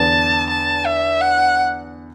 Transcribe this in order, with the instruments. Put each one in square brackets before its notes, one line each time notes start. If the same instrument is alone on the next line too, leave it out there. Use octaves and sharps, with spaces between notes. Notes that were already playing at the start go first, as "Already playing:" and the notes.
Already playing: [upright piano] E2 D3 B3 D4 [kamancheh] A5
[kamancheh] A5
E5
F#5